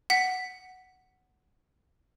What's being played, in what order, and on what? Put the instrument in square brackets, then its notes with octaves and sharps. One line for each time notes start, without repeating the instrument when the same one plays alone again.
[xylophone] F#5 B6